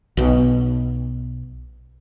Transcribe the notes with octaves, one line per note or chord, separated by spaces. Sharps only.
B1 B2